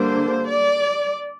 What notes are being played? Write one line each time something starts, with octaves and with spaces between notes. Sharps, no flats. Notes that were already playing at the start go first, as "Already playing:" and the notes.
Already playing: D3 G3 A#3 D4 C5
D5